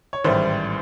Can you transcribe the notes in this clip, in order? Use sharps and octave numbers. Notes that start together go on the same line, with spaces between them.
C#5
A1 G#2 D#3 G3 C5